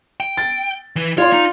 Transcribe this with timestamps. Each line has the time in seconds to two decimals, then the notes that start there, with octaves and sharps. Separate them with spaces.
0.20 G5
0.37 A6
0.96 E3 B4
1.18 F4 C#5 D5 C6
1.33 D#4